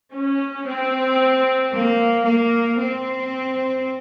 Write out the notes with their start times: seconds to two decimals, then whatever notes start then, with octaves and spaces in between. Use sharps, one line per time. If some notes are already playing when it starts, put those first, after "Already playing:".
0.12 C#4
0.65 C4
1.72 A#3
2.25 A#3
2.79 C4